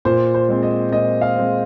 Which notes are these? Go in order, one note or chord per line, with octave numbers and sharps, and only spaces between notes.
A#2 C5
C5
G#3 C4
D#5
A#2 D#5
F5
G#3 C4